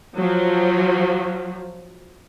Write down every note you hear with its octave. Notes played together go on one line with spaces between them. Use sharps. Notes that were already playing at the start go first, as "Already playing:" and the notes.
F3 F#3